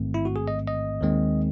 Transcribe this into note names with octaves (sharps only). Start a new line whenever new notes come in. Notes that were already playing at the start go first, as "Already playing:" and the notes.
Already playing: A1 G#2 D#3 A3 C4
E4
F#4
G#4
D#5
D#5
D#2 D#3 G#3 C4